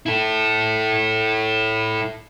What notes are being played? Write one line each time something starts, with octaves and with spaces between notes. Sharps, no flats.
E4 A4